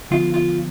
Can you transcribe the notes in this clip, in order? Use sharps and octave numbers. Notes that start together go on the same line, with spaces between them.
D3 F3 B3 F4
F4